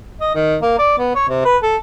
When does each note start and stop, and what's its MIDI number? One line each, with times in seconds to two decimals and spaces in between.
0.21 0.31 75
0.35 0.57 51
0.62 0.75 58
0.79 0.95 74
0.98 1.13 59
1.15 1.25 73
1.29 1.42 48
1.45 1.57 71
1.63 1.77 69